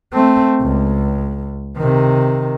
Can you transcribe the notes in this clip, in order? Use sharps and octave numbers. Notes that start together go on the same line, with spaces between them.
A3 C4
C#2
C3 D#3